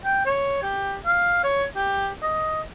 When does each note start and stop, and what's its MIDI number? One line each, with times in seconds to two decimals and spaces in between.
0.04 0.25 79
0.25 0.61 73
0.63 0.96 67
1.05 1.41 77
1.44 1.65 73
1.75 2.09 67
2.22 2.61 75